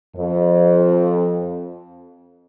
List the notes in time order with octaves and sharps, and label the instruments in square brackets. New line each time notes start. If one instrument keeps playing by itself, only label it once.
[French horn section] F2